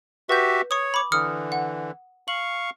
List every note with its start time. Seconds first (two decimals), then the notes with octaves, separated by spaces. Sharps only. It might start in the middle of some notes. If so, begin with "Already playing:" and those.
0.29 F#4 G4 B4 E5 G6
0.71 C#5 C#6 D#6
0.94 B5 D6
1.12 D3 E3 D#6 F6 C#7
1.52 F#5
2.28 F5 C#6 F#7